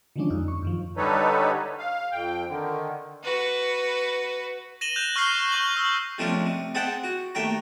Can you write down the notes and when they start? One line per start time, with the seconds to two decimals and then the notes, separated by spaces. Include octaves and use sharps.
0.16 D3 D#3 F3 G#3 C#4 D4
0.30 F2 D#4
0.48 C#6
0.62 F#2 D#3 F3
0.97 D3 G3 D#4 A4 B4 C#5
1.79 F5
2.12 F2 G5
2.47 D3 D#3
3.23 F#4 B4
4.81 A#6 D#7 E7 F#7 G7
4.96 F#6 G6 E7 F7
5.16 C#6 F6 G6 A#6 C7
5.52 C#6 G6 F#7
5.77 E6
6.18 C3 F3 G#3 A3 C#4 D4
6.46 C3
6.74 C4 G#4 A4 E5 F#5 G5
7.04 F#4
7.35 D#2 A3 E5 G5 A#5